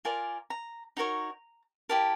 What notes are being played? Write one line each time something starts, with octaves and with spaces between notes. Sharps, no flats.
F4 A#4 D5 G#5
A#5
D#4 F#4 A#4 C#5 A#5
E4 G4 A#4 A5